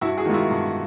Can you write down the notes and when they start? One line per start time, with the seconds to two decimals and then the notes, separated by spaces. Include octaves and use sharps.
0.01 G2 E4 F#4
0.18 F#4 G#4
0.26 D#3 G#3 F4
0.34 E4 F#4
0.51 G2